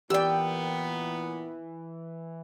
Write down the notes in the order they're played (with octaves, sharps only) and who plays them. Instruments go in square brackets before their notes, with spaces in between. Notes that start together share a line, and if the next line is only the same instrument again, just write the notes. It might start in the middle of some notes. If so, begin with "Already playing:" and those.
[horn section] A#2 B3 [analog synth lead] E3 [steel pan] G4 D5 [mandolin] G5 E6